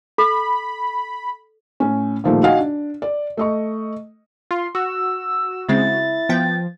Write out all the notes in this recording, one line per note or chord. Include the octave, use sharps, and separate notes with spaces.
A4 B5
A2 C#4
A#2 D#3 F3 G3 A3 A#3
D#4 F#4 D#5 F5 F#5 G#5
D4
D5
A3 D#5 C#6
F4 C6
F#4 E6
C#3 G#3 C4 E4 A6
F3 B3 G5